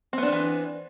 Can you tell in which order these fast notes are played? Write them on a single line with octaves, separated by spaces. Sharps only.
C4 B3 D4 D#3 E3